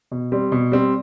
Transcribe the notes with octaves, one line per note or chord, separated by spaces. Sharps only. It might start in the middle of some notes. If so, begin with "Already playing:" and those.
B2
G3 C4
B2
G3 C4